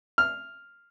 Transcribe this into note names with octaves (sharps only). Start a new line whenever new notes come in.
F6